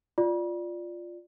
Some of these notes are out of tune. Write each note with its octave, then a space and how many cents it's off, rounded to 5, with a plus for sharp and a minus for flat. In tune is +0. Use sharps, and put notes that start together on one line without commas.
F4 +0 D5 +5